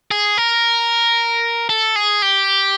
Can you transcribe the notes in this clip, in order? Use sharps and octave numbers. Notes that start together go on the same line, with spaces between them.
G#4
A#4
A4
G#4
G4